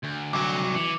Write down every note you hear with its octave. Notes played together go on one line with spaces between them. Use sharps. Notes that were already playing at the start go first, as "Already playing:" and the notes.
D2
C2 F#3 D6
E3 C#7